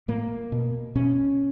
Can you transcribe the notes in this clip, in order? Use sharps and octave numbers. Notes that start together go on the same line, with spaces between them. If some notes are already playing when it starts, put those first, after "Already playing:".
A2 A#3
B2
B2 C#4